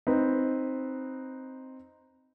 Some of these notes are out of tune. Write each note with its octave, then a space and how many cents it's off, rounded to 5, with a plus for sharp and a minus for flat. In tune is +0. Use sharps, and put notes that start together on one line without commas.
C4 +0 D#4 +0 B4 +0